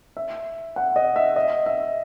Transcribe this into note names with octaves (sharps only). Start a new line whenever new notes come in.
E5
F#5
D#5
E5
D#5
E5